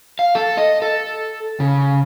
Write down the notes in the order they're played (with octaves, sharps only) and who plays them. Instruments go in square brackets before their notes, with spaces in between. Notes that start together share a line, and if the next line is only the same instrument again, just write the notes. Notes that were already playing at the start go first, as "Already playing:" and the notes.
[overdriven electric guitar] F5
A4
D#5
A4
C#3